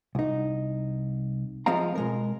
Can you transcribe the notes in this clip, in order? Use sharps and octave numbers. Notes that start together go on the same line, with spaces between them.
C2 D#4
F3 G#3 C4 D#5 F5 A#5
B2 G#3 A#4